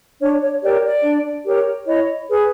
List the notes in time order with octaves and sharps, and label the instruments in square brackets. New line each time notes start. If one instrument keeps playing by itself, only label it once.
[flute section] D4 C#5
C#5
G4 A#4 C#5 D5
D5
D4
G4 A#4 C#5
E4 C#5 D#5
G#4 B4